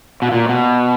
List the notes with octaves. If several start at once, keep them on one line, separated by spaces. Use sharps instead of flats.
B2
A#2
B2